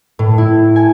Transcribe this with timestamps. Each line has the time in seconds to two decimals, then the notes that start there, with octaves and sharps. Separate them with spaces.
0.19 A2
0.38 E4
0.76 G#5